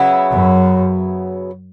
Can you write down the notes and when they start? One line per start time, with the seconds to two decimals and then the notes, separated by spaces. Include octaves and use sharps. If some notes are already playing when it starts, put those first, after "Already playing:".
Already playing: C#3 F#3 B3 E4
0.32 F#2